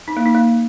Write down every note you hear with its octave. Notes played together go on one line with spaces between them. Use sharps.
D#4
A#3
D#4
A#3